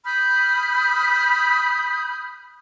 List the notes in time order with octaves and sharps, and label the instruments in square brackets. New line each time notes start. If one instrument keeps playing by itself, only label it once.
[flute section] B5 D#6 F6 G6